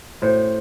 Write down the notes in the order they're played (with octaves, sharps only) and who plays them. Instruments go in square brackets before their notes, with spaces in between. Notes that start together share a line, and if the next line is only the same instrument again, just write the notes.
[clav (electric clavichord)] A2 [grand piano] C5